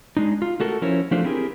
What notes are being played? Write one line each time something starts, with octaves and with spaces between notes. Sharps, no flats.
G#3 D4 D#4
F4
A3 F#4 A4 A#4
F3 C#4 E4 A#4 C5 C#5
F3 A3 D4 F4 C5
C4 E4 G4 G#4 A#4